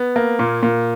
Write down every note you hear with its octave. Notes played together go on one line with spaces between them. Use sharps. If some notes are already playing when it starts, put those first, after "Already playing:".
Already playing: B3
A#3
A#2
A#2